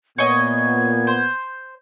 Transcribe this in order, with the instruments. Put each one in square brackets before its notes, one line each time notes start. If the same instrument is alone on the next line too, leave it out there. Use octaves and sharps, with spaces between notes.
[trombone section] A#2 B3 [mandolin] C#5 D#5 [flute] G#6
[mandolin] C5